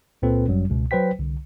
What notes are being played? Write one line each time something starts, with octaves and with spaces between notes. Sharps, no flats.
C#2 A#2 C4 A4 B4
G1 F#2 F#3 G3
C#2 B2
F#3 B4 C5 G5 B6
C2 D3